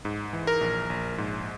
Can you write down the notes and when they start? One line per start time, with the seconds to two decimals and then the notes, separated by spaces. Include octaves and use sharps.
0.05 G#2
0.33 E3
0.47 A#4
0.61 A#1
0.90 A#1
1.18 G#2